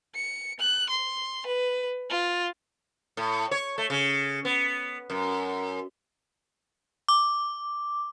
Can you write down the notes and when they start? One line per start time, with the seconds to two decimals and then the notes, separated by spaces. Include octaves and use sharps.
0.15 C#7
0.60 F#6
0.89 C6
1.47 B4
2.10 F4
3.17 A2
3.51 C#5
3.78 A3
3.90 C#3
4.45 B3
5.10 F#2
7.08 D6